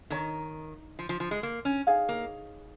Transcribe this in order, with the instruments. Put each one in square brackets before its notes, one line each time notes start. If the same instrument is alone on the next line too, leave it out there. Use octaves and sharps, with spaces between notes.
[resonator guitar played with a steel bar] D#3 [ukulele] D#4 C#5 A#5
[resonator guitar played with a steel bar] F3
F3
F3
G#3
A#3
C#4
[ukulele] D#4 G#4 C#5 F5
[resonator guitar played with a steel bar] A#3